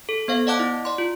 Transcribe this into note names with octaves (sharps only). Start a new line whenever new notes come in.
A4
B3 C5 F5
D5 D#5 F#5 A5 D6 F#6
E4
D5 C6
F4